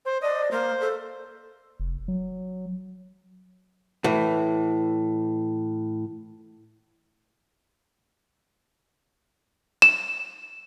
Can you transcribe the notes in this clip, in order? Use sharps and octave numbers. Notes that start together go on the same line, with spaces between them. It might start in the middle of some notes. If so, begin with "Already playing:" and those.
C5
D5 D#5
A#3 C5
A4
F1
F#3
A2 E3
E7